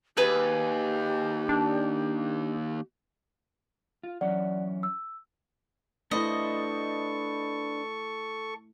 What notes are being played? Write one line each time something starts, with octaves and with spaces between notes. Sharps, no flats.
D#2 G4 G#4 B4
D4
F4
E3 F#3 C#4 D5 F#5
E6
A3 D4 E4 A4 B4 C5 D#5 C#6